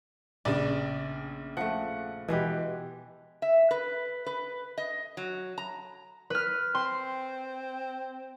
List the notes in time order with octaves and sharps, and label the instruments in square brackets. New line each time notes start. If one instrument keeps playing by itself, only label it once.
[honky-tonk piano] A#1 C#3 [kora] B3 [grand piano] D5
[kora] F3 A3 [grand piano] F#5
[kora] B2 G#3 B4 [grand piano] E3 G4
[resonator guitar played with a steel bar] E5
B4
B4
D#5
F#3
A#5
[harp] B4 F6
[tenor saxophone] C4 [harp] C6